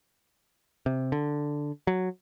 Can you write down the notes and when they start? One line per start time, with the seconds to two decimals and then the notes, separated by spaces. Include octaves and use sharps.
0.86 C3
1.12 D3
1.87 F#3